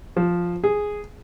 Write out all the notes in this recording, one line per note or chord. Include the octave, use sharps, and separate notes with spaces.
F3
G#4